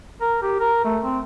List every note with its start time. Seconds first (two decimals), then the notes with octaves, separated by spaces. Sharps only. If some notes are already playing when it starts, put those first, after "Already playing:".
0.21 A#4
0.43 G4
0.60 A#4
0.85 A3
1.03 C4